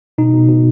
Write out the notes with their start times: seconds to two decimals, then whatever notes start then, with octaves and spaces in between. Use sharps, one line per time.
0.18 B2 D#4
0.33 B2
0.49 B2